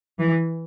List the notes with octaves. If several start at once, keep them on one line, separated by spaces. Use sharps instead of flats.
E3